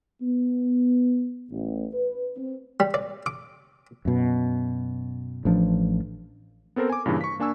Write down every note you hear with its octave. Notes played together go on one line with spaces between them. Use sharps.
B3
A1
B4
C4
G3
D5
D6
F#2 B2
A1 F3 D4
B3 C4 A4 A#4 C5
G#5 D6
G2 A#2 C#3 E3
C#6 B6
A#3 D4 G#5 C#6 E6